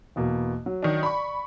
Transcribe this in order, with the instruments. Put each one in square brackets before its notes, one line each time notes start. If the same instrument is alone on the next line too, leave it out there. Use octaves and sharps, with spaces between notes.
[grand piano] E2 B2 A#3
F#3
[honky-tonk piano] D#3 D4
[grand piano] D5 [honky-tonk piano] B5 C#6